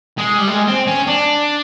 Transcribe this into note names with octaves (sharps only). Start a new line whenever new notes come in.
G#3
G3
G#3
C4
C#4
D4